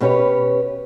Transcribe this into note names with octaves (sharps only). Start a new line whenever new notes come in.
B2 C#4 G4 B4 C#5